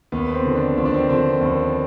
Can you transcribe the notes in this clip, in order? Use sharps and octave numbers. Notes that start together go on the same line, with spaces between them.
D#2 B3
C4
D3 F3
D4
D#2 C4
D4
C4
D3 F3 C4
D#2